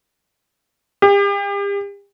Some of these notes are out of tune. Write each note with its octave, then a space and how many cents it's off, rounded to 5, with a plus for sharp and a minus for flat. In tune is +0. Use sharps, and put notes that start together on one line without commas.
G4 +40